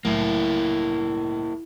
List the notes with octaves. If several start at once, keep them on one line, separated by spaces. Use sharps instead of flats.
C2 A2 F#3 A#3 E4